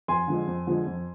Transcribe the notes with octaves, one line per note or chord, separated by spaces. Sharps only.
F2 G#5 C6
D3 F3 G#3
F2
D3 F3 G#3
F2